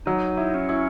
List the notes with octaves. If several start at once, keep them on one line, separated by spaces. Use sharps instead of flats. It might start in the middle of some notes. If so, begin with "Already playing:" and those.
F#3 D#4
E4
C#4
E4